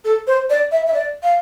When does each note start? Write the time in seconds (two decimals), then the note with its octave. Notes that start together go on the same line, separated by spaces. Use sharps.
0.04 A4
0.27 C5
0.50 D5
0.71 E5
0.86 E5
0.94 D5
1.23 F5